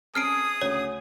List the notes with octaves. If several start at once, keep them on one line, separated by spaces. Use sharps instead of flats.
C4 C#4 G#4 A5 D#6 F6 C7 D7
D2 C#3 C#5